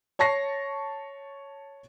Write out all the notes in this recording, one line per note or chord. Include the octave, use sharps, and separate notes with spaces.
C#5 A5 C#6 A#6 C7